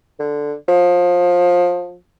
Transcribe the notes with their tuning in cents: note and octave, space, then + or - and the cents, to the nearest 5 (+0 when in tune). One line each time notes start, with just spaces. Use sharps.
D3 +0
F3 +20